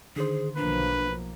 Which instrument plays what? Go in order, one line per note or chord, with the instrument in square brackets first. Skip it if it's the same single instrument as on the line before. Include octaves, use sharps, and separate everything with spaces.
[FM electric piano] D3 D#3 C5 [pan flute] G#4
[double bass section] B1 F3 A#3 [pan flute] D4 [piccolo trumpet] B4